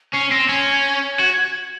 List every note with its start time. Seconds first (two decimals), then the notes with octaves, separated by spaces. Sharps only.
0.13 C#4 C7
0.31 C4 A#6
0.49 C#4 G#6
0.67 G#6
1.20 F#4